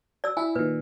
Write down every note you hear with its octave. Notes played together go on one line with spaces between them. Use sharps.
D5 E6
E4 E5 G#5
A#2 D#3 B4